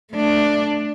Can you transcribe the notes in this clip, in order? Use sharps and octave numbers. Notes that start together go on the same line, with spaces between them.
A3 D4